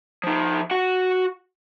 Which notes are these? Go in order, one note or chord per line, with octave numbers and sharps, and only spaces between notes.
F3 D#4
F#4 F#5